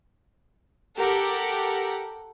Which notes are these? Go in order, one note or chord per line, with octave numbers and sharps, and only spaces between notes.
G4 A4 A#4 F#5